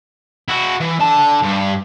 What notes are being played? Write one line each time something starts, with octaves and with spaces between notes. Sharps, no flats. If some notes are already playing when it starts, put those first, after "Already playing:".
E4 F#4
E3
D3 A5
G2